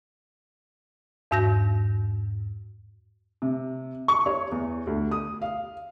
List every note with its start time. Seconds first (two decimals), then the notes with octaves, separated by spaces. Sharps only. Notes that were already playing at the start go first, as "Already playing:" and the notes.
1.31 E2 G#2 F#4 G6 A#6
3.42 C3
4.08 C#6
4.26 C#5
4.51 E2
4.87 D2
5.11 D#6
5.42 F5